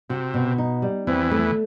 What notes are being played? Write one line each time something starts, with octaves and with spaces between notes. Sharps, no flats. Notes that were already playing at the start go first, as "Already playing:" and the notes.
C3 F#4
B2
D#4
G3
E2 E3 C4
A3